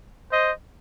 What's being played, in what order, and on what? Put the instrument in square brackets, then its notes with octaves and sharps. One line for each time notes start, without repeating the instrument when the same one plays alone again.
[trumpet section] C5 D#5